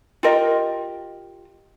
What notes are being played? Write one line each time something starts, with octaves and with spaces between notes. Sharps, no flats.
F4 G4 A#4 D#5